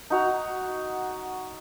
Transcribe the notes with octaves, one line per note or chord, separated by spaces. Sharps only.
D#4 F#4 A#5